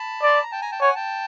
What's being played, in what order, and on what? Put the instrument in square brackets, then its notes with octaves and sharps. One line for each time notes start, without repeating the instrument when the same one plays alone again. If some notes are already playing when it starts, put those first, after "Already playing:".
Already playing: [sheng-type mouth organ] A5 B5
[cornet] D5 [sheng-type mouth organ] C6
[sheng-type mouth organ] B5
A#5
G5 A5
G#5 A#5
G5 A5
[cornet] C#5 [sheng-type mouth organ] F#5 G#5
[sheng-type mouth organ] G5 A5